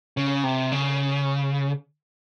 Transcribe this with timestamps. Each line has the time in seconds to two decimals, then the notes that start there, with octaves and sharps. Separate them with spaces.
0.17 C#3
0.44 C3
0.72 C#3